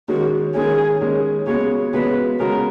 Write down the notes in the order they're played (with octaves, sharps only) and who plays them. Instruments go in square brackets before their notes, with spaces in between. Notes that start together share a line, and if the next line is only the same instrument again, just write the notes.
[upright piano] D#3 G#3 C#4 [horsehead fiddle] F#4
[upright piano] D#3 G#3 C#4 [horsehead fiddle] G#4
[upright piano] D#3 G#3 C#4
[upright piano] C#3 G#3 B3 F#4 [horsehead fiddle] C#5
[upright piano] C#3 G#3 B3 F#4 [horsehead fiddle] B4
[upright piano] C#3 G#3 B3 F#4 [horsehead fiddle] A#4